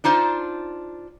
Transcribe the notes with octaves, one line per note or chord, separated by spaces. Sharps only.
D4 D#4 F4 C5